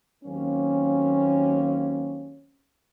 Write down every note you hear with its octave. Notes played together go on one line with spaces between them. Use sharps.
D#2 F#3 A#3 C4 C#4